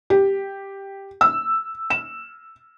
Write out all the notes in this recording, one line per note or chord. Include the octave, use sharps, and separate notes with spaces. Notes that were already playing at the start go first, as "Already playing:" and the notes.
G4
E6
E7